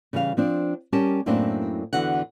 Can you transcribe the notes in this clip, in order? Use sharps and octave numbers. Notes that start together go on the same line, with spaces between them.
C#3 E3 G3 F5
F3 C4 D4
G3 C#4 G4 A#4 A5
F#2 A2 A#3 C4 D4 E4
E2 D3 E3 F#4 F#5